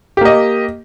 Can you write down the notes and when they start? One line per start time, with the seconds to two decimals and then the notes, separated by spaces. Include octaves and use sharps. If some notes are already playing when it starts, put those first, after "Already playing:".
0.17 G4
0.21 A#3
0.25 D#5